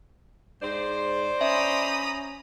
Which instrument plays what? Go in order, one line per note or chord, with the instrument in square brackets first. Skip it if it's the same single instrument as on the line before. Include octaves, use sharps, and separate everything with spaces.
[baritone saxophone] G#2 [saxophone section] C5 D5
[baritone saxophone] C#4 [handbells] E5 [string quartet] A#5 B5 D#6